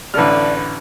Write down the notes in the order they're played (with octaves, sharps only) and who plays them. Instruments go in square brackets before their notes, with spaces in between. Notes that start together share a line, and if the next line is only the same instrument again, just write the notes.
[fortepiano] A1 F6 [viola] D3 B4 [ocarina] D5